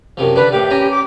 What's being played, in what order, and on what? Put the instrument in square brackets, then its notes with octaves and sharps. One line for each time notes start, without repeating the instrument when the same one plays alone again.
[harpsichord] F#2 C3 F3
[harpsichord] D3 D4 [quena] B4
[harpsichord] A2 F5 [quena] G4
[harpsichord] C#4 G#5 A#5
[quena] D6